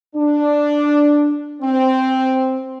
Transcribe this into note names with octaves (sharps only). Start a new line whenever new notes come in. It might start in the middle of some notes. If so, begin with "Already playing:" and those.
D4
C4